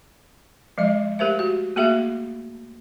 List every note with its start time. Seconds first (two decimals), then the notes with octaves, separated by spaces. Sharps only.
0.78 F3 G#3 D#5
1.19 A3 G4 A#4 C5 E5
1.39 F#4
1.76 A3 A#3 F#4 G#4 E5